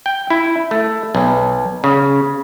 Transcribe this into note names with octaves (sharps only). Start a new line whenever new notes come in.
G5
E4
A3
B1
C#3